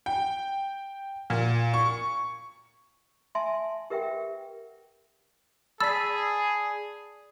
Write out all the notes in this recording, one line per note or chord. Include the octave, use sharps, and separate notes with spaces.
G5
A#2
C#6
E5 G#5 A5 C6
G4 A#4 B4 E5 F#5 G5
G#4 D5 A5 B5 E6 A6 B6